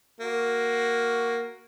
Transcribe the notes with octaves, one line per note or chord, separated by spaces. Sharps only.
A#3 F#4